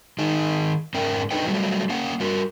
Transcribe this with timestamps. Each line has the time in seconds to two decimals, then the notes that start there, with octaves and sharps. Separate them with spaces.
0.18 D#3 D#4 G#4
0.94 G#2 C#4 A#4 E5 G5
1.31 D4 D#4 A4 B4 D#5 G5
1.47 F#3 G3 A3
1.89 A#3 C#4 C#5 F#5
2.20 G3 F#4 A#4